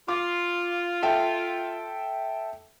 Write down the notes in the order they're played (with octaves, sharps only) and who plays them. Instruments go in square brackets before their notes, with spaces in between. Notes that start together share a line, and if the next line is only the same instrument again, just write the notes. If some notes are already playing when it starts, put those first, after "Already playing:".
[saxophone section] F4 [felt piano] D6
[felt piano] A4 E5 G5